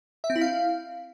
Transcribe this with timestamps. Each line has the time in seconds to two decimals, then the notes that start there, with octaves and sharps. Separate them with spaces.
0.24 E5
0.30 C4
0.36 E4
0.41 F5